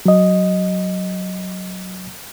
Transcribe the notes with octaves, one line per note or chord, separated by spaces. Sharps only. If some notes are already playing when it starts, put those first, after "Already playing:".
F#3 D#5